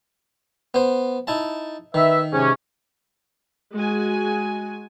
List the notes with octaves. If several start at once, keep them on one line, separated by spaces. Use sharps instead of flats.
B3 C5
D#4 E4 A5
D#3 B4 E5
G#2 C3 C#4
G#3 F#4 G#5